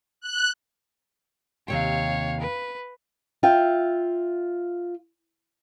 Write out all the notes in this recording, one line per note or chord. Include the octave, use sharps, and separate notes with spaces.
F#6
D#2 C3 C#5 F5 G5
B4
F4 E5 G5